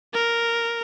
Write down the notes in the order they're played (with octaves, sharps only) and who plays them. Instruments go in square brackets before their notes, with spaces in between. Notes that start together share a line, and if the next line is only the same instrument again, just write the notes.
[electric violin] A#4